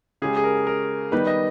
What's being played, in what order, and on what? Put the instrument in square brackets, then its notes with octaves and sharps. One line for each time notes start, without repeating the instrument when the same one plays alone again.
[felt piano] C#3 G#3 C#4 G4 [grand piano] G#4
[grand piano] G#4
A#4
A#4
[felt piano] D#3 G3 B3 D#4 G4 [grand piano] B4
[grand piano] D#5